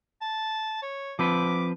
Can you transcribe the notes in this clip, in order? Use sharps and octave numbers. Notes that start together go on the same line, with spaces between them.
A5
C#5
F3 C4 B4 D6